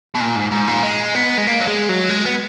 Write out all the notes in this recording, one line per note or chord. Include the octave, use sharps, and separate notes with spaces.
B2
A#2
G#2
G#2
A#2
G#3
B3
G#3
A#3
F#3
G#3
F#3
G#3
B3